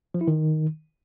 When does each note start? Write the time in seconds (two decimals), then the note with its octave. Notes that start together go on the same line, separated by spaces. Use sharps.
0.14 F3
0.21 E4
0.27 D#3